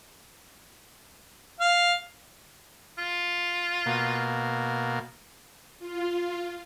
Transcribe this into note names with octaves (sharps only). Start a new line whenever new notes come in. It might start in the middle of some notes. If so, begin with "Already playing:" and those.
F5
F4
B2 A#3
F4